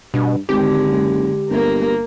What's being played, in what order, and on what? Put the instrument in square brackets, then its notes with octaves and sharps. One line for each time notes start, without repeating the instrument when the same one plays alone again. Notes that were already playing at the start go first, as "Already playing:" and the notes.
[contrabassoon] G2 [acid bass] B2
[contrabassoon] G#1 [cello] D3 G#3 [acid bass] G4
[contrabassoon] F#1
[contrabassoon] G1 [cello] A#3 A#4